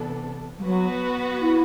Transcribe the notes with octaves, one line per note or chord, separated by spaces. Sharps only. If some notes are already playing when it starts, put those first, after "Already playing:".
Already playing: C3 E3 B3 D4 A4
G3
F#3 B3 F#4 B4
E4